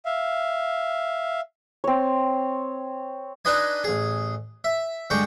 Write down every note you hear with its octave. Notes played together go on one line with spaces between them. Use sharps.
E5 F5
C4 C#5
D4 D#4 B4 D#5 G#5
A1 G#4
E5
G2 D3 G#3 G5 C#6